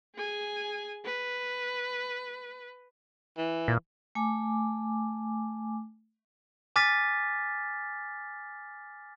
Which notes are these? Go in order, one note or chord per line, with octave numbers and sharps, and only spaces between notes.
G#4 G#5
B4
E3
A#2
A3 G#5 D6
G#5 D6 F6 A6 B6